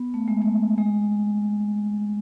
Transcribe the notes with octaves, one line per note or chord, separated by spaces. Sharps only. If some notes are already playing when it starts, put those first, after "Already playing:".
Already playing: B3
A3
G#3
A3
G#3